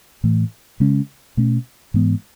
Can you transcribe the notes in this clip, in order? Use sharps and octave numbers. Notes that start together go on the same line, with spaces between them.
A2 E3 A3
C#3 G#3 C#4
B2 A3 C#4
G#2 E3 G#3 B3